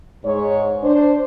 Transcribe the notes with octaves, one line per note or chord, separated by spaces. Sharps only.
G#2 G#3 C#5
D4 C5